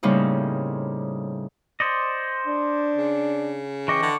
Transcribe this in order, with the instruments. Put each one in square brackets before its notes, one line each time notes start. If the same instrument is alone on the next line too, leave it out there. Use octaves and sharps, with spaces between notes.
[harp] A2 C#3 G3 A#3 C4 D#4
[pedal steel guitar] C5 D5 D#5 [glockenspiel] C#7
[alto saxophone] D4
[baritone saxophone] C#3
[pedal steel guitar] E3 D#5 G5 [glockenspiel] C#6 D6 C#7
[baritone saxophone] D3